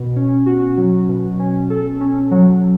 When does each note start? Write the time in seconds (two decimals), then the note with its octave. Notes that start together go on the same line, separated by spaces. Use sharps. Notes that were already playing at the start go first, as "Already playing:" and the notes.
Already playing: B2
0.16 C#4
0.46 F#4
0.77 F#3
1.08 B2
1.40 C#4
1.70 A4
2.01 C#4
2.31 F#3